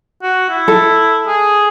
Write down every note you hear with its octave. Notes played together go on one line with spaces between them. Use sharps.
F#4
E4
A4
G#4